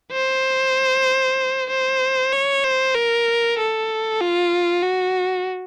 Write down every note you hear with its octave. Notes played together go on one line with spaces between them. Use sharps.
C5
C5
C#5
C5
A#4
A4
F4
F#4